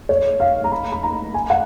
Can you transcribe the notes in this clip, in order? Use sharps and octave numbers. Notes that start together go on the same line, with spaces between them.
C#5
F5
A#5
B5
B5
A#5
G#5
F#5